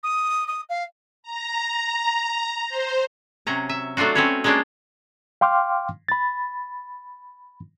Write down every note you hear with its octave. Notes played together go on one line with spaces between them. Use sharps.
D#6
D#6
F5
A#5
C5
C3 F#3 C#4 A#5
E5
F#3 A3 D4 F4 F#4
C4 C#4 F#4 B4 C#5
G#3 A#3 C#4 D4 F4 A#4
F5 G5 C6 D6 F6
B5 A6